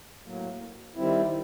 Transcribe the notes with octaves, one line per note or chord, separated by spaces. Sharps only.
A2 F#3 A#3
D#3 G3 C4 E4